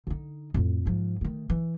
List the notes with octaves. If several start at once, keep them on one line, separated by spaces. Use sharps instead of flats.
D3 D#4
F2 A2
G#2 F3
D#3 A3
E3